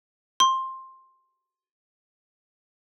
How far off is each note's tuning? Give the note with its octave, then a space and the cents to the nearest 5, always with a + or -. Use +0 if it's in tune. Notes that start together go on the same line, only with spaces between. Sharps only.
C6 +10